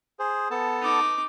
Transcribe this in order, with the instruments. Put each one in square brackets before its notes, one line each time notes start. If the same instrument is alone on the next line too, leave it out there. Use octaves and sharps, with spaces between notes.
[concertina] G#4 C5
B3 A4 A5
[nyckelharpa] D#4 D6